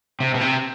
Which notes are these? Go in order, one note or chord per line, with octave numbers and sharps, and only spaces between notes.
C3
B2
C3